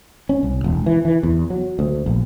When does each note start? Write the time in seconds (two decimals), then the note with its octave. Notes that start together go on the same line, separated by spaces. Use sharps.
0.29 C#4
0.43 C2
0.64 E1
0.86 E3
1.05 E3
1.23 E2
1.50 F#3
1.79 D2
2.06 A#1